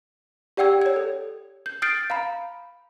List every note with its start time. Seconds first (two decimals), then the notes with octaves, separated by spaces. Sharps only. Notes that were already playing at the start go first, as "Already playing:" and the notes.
0.57 G4 D5 F#5 G5 E6 G#6
0.82 C#5 G#6
0.96 A4
1.66 G6
1.82 D#6 F6 G6 A6 C7 D7
2.10 F5 A#5 B5